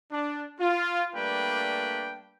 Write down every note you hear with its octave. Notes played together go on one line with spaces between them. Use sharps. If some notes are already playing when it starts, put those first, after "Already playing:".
D4
F4
G3 A3 A#3 D4 B4 G5